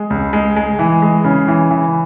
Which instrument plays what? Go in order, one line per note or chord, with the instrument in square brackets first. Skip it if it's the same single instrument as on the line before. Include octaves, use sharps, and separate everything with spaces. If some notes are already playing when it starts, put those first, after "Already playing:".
Already playing: [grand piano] G#3
C#2
G#3
G#3
E3
G#3
C#3
E3
E3